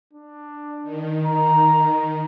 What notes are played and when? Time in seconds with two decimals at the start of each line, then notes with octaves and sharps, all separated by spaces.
0.13 D4
0.83 D#3
1.26 A#5